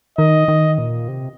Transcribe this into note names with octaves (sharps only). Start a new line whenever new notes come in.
D#3 D#5
D#3
A#2
C3